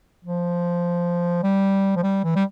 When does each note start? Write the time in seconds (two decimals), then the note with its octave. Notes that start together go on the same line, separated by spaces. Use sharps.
0.25 F3
1.43 G3
1.96 F3
2.03 G3
2.24 E3
2.36 G3